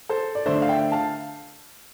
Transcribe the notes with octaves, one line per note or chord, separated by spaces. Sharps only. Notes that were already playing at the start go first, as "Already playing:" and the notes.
A4 C5
D5
D3 A3 D4 C5 E5
F5
E5 G5
F5 A5